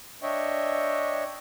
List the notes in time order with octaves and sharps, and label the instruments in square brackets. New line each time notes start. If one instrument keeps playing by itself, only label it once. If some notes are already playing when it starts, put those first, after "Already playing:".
[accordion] D4 C#5 D#5 E5 G5 C#6